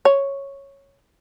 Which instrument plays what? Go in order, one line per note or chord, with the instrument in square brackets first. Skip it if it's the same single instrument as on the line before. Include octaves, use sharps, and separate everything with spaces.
[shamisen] C#5